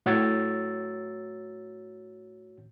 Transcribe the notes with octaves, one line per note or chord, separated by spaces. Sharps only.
A2 F#4 C#5 E6 A6